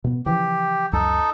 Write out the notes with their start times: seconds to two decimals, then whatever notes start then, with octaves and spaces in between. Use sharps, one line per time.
0.04 B2 B3
0.26 C#3 E3 F3 G4
0.93 C#2 F#2 F#3 D#4 A4